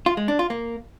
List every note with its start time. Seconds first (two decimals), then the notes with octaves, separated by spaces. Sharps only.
0.06 F4
0.17 G#3
0.28 D4
0.39 F4
0.50 A#3